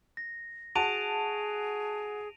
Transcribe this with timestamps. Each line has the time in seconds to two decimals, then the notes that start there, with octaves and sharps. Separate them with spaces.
0.17 A#6
0.75 F#4 G#4 A5 D7 D#7 F7